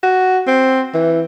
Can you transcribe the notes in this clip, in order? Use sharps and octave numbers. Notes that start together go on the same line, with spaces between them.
F#4
C4
E3